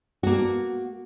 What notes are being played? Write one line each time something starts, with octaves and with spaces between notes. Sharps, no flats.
A#3 F#4